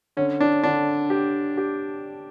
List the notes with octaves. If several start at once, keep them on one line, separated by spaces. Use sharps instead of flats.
D3 C#4
D4
D3 D4
G4
G4